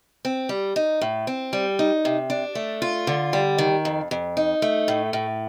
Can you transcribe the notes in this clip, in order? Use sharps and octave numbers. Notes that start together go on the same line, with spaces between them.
C4
G3
D#4
A2
C4
G3
D#4
C3
D4
A3
F4
D3
G3
D#3
F2
F2
D#4
A3
A2
A2